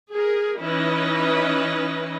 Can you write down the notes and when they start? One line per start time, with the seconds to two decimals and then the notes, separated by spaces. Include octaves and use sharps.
0.12 G#4 A#4
0.59 E3 C#4 D#4 E4 B4 D#5